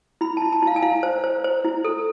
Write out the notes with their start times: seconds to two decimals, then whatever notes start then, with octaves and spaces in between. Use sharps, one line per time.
0.21 E4 B5
0.37 A5
0.42 E4
0.52 A5
0.63 E4 F5
0.76 G#5
0.82 E4 F5
1.03 C5
1.24 C5
1.44 C5
1.65 E4
1.85 A4